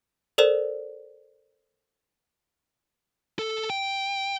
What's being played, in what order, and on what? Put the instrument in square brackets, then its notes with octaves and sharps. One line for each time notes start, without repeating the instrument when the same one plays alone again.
[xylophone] A4 A#4 C5 D5 E7
[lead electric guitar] A4
G5